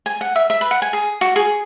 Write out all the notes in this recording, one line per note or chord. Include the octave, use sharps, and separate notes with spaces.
G#5
F#5
E5
E5
B4
F#5
G#5
G#4
F#4
G#4